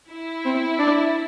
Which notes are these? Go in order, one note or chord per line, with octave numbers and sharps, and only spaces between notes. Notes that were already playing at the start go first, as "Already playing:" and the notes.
E4
C4
D4